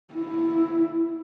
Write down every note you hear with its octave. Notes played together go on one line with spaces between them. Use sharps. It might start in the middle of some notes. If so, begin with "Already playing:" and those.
E4